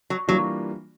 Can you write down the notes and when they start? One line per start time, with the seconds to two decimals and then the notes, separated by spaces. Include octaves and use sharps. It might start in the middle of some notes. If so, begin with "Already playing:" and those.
0.10 F#3
0.28 E3 F#3 G3 A#3 D4 F4